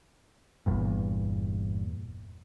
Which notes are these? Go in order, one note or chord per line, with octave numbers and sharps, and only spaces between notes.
G1 E2 G2 A#2